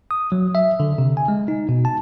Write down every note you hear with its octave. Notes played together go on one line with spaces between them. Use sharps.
D#6
F#3
E5
D3
C3
G#5
G#3
D#4
B2
A5